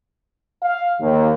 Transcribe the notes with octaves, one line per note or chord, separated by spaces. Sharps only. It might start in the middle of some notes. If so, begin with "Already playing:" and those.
F5
D#2